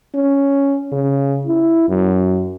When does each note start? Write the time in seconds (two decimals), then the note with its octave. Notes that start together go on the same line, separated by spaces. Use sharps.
0.15 C#4
0.92 C#3
1.47 E4
1.89 F#2